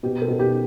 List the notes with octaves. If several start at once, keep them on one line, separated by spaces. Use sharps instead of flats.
B2 G4
A4
B2
G4